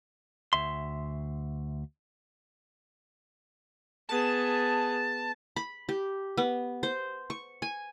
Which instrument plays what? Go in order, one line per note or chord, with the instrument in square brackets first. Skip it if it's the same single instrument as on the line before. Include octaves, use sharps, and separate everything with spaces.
[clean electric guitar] D2 E5 C6
[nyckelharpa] B3 G#4 [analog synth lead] A5
[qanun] B5
G4
B3
C5
C#6
G#5